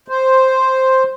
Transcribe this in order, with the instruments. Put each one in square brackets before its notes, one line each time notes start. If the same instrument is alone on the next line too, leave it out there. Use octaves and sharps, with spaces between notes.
[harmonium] C5